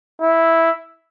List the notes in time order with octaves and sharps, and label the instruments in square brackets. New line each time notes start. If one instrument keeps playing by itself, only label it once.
[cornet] E4